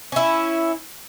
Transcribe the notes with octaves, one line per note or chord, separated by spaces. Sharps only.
C#4 E4